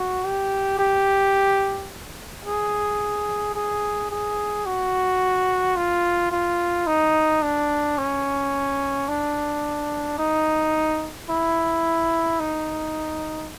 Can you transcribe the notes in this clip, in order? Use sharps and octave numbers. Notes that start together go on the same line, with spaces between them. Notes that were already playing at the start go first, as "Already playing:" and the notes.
Already playing: F#4
G4
G4
G#4
G#4
G#4
F#4
F4
F4
D#4
D4
C#4
D4
D#4
E4
D#4